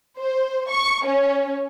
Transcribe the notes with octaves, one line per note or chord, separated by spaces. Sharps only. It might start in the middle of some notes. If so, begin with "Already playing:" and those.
C5
C#6
C#4